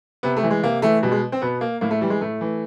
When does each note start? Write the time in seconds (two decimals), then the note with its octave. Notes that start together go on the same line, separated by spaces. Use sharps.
0.23 C3 B3
0.37 A3
0.43 E3
0.50 G#3
0.63 C3 A#3
0.82 E3 A3
1.03 B2 G3
1.12 G#3
1.32 C4
1.42 B2 B3
1.61 A#3
1.81 A2 A#3
1.91 A3
2.01 E3 G3
2.10 G#3
2.21 A2 A3
2.41 E3